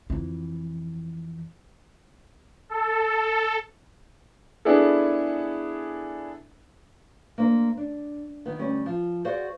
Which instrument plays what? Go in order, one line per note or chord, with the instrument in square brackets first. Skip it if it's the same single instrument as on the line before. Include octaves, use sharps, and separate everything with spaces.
[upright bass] F2 E3
[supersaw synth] A4
[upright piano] B3 D4 E4 G#4 A4
[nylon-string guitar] A#3 D4 C5
D4
D#3 B3
D2 G3 C#4
F3
F#4 G#4 C5 D5 F5 F#5